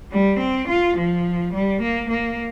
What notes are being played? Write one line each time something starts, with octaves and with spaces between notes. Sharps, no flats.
G3
C4
F4
F3
G3
A#3
A#3